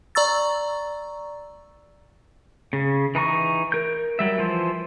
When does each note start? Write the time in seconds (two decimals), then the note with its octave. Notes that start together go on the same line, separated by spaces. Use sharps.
0.15 D5 A#5 C#6 E6 A6
2.73 C#3
3.15 E3 D#4 A#5 C#6
3.72 A#4 G6
4.19 F#3 G3 E5
4.38 E3 F3 C5